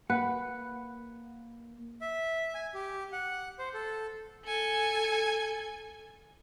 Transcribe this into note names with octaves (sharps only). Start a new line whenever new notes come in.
A#3 B4 F#5
E5
G#5
G4
F#5
C5
A4
A4 G#5